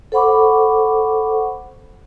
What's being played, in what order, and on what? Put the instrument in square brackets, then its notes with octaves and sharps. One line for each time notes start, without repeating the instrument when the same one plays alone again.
[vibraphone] A4 C5 F#5 B5 C#6 D6